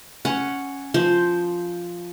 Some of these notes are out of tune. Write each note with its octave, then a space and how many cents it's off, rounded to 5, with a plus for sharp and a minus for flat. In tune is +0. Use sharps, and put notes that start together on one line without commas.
C#4 +0 F#5 +0
F3 +0 C5 +0